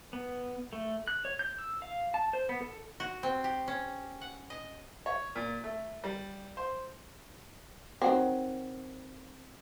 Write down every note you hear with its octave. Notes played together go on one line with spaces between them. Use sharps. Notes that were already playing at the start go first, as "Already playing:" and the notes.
B3
A3
F#6
C#5
G6
E6
F5
A5
C5
B3
A4
F#4
C4
G4
C#4
F#5
D#5
C#5
A#2
A3
G3
C5
D#3 F#3 C4